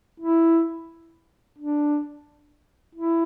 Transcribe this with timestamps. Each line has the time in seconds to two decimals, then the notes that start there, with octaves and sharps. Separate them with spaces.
0.20 E4
1.59 D4
2.95 E4